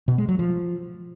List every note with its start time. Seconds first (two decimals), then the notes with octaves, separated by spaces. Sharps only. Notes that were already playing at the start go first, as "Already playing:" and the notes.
0.08 B2
0.18 G#3
0.29 F#3
0.39 F3